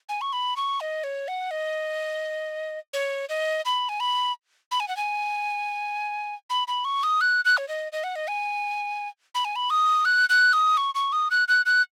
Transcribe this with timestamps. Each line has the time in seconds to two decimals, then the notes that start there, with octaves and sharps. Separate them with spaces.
0.09 G#5
0.21 C#6
0.33 B5
0.56 C#6
0.80 D#5
1.04 C#5
1.28 F#5
1.51 D#5
2.93 C#5
3.29 D#5
3.65 B5
3.89 G#5
4.00 B5
4.71 B5
4.80 G#5
4.88 F#5
4.97 G#5
6.50 B5
6.68 B5
6.85 C#6
7.03 D#6
7.21 F#6
7.45 F#6
7.57 C#5
7.68 D#5
7.92 D#5
8.04 F#5
8.16 D#5
8.28 G#5
9.35 B5
9.45 G#5
9.56 B5
9.70 D#6
10.05 F#6
10.29 F#6
10.53 D#6
10.77 C#6
10.95 C#6
11.12 D#6
11.31 F#6
11.48 F#6
11.66 F#6